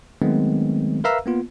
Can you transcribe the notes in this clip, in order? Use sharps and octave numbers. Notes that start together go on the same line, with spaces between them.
D#3 F#3 G#3 A3 B3 C4
A#4 B4 E5 F5 A#5 E6
A#3 B3 F4